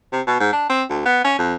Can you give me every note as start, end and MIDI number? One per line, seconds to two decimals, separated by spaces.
0.12 0.21 48
0.27 0.38 47
0.40 0.52 44
0.53 0.66 62
0.70 0.83 60
0.90 1.05 38
1.06 1.20 59
1.24 1.36 61
1.39 1.55 41